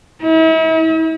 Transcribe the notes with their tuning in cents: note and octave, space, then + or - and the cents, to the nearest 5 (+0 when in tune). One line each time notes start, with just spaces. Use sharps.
E4 -40